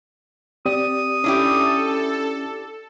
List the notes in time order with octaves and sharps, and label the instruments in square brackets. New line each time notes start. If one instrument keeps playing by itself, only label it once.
[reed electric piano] C4 G4 D5 [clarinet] D#6
[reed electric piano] C#4 [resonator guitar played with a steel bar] D4 E4 G4 [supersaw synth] A4